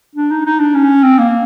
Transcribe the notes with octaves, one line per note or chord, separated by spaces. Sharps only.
D4
D#4
D#4
D4
C#4
C4
A#3